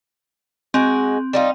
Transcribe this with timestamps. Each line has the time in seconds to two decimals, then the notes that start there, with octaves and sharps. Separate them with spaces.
0.74 G#3 C4 F#4
1.33 G3 D#4 F4